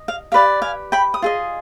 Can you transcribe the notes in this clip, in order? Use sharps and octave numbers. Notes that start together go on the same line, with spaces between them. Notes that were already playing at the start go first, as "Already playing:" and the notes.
Already playing: D#5
F5
G4 B4 D5 F5
F5 G#5
G5 B5
D#6
F4 G#4 D#5